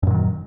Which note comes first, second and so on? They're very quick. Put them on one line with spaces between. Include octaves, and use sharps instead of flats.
F#2 A#2 F#3 D#3